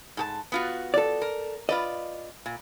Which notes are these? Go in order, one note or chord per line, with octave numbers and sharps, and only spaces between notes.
G#2 G4 A5
B3 F4 F#4
A4 D5
A#4
F4 B4 D5 D#5
A#2